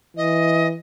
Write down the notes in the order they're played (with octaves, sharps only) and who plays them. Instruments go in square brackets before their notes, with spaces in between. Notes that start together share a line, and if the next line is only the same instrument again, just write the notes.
[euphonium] E3 [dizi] D#5